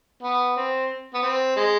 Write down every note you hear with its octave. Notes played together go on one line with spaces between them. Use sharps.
B3
C4
B3
C4
G#3